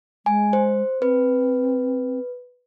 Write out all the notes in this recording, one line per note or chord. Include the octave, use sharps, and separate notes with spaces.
G#3 G#5
C5
C4 B4